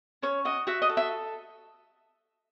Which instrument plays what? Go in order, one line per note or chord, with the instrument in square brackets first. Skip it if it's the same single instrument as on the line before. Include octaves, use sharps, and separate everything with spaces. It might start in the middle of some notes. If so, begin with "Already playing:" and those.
[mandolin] C#4 C#5
F#4 D#5
F#4 E5
D#5
A4
E5